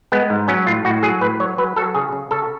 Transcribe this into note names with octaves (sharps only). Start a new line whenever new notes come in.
G#3 B3
G#2
F#3 C#4
A2 F4
A2 F#4
F#3 G#4
A2 B4
F#3 C#5
F#3 B4
F#3 A4
C#3 G#4
C#3
C#3 A4